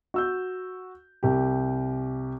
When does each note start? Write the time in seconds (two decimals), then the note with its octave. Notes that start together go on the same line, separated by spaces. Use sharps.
0.14 F#4 E6 G6
1.23 C2 G4